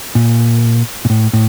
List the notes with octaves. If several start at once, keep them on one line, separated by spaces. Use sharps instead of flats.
A#2
A#2
A2
A2